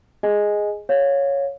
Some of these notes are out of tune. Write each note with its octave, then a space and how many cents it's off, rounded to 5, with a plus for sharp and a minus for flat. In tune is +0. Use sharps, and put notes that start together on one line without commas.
G#4 +0 D#5 +0 G#5 +0
C#5 +0 F5 +15